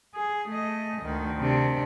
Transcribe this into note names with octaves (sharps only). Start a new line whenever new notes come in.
G#4
A3 D#5
D2 D#3
C3 D4